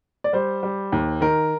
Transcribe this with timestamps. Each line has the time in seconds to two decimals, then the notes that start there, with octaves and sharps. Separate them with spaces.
0.24 D5
0.33 G3 C5
0.63 G3
0.92 D#2
1.21 D#3 A#4